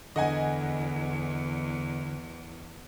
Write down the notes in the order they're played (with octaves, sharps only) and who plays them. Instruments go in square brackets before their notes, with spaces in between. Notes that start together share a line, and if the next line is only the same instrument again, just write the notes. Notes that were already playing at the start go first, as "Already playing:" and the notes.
[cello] E2 [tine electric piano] D3 [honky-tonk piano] D#5 F#5 G#5